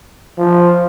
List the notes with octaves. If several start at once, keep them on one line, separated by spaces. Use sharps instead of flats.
F3